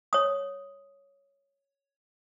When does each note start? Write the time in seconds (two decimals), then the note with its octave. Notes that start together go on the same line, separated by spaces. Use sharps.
0.13 C#5 D#6